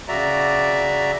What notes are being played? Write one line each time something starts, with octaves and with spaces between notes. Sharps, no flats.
C#3 F#4 D5 E5 A#5